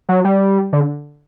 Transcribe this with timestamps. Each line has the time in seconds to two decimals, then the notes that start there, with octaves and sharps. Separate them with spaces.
0.09 F#3
0.25 G3
0.73 D3